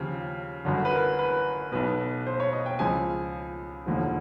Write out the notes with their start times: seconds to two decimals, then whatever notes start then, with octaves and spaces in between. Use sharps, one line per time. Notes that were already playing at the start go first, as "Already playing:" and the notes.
Already playing: D#2 C#3 F3 G4
0.65 G1 F#2 D3
0.85 B4
0.92 A#4
1.19 B4
1.72 B1 B2 B4
2.27 C5
2.40 C#5
2.53 D#5
2.66 G5
2.79 C#2 C#3 F3 G#5
3.86 E1 D#2 D3 F3